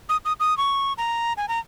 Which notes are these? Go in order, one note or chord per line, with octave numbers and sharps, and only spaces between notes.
D#6
D#6
D#6
C#6
A#5
G#5
A#5